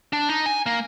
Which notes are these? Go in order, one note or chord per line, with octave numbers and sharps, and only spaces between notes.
D4
D#4
G#5
A#3